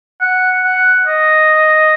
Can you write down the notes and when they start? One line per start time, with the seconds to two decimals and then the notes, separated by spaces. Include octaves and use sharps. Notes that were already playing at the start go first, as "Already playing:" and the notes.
0.21 F#5
0.64 F#5
1.07 D#5